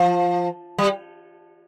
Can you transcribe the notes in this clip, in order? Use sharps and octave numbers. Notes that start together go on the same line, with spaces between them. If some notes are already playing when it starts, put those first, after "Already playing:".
Already playing: F3
G3